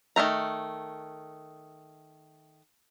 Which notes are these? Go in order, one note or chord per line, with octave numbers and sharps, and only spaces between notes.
D#3 F3 A3 A#5